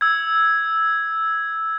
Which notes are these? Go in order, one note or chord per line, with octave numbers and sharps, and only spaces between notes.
E6 G#6